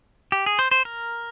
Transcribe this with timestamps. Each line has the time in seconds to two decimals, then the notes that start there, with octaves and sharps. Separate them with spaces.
0.32 G4
0.46 G#4
0.59 C5
0.71 C5
0.85 A#4